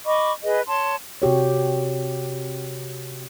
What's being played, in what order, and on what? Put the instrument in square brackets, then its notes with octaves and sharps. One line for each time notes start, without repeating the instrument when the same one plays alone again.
[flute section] D#5 B5 C#6 D6
G#4 B4 D#5
C#5 A5 C6
[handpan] C3 F#4 G4 C#5